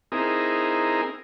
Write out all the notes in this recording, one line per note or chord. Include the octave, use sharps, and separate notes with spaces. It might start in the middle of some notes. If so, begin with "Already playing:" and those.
C4 D#4 E4 G#4 A#4